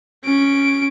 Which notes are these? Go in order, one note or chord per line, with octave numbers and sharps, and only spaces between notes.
C#4 D7